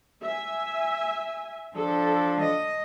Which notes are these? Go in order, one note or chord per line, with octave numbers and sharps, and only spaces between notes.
E5 G#5
F3 D4 A4
D#5